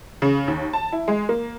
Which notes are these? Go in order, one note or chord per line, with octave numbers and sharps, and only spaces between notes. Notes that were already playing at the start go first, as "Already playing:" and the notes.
C#3
D#2
A5
E4
G#3
A#3